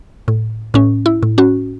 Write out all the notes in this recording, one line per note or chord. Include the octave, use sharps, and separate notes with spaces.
A2
A2 C#4
E4
A2
C#4 F#4